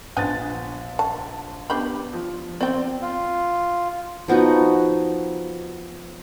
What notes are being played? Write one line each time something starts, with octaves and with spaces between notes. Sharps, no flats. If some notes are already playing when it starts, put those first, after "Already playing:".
A#1 B3 D4 G#5 A6
A5
B3 D4 G4 B5
F3
C4 D5 G5
F4
F3 B3 D#4 F#4